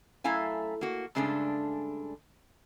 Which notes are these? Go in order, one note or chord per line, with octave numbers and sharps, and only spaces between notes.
F#2 A3 E4 F5 G#5
A#3 F#4
G2 C#3 G#3 A3 D4